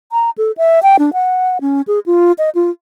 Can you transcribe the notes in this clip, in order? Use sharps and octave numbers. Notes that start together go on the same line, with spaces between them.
A#5
A4
E5
G5
D4
F#5
C#4
G#4
F4
D#5
F4